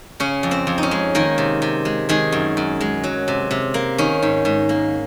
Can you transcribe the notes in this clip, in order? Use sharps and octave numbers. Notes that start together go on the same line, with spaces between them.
C#3 C#4
F2
C4
F2
D#4
C#4
G#3
D#3 A#3 A#4
C3
C3
G#3
D#3 G#3 G#4
F#2
F#2
G#3
F#3
C3
C3
A#3
D#3 C#4
G#2
G#2
A#3